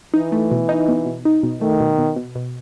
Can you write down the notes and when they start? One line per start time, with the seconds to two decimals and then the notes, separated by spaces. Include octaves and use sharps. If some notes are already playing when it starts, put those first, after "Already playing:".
0.14 E3 D#4
0.32 A3
0.51 B2
0.69 D#4
0.88 B2
1.06 B2
1.25 D#4
1.43 B2
1.61 D#3 A3
1.80 B2
1.99 B2
2.16 B2
2.35 B2